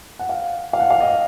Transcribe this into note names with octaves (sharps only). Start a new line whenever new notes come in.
F#5
F5
F5
F#5
F5
D#5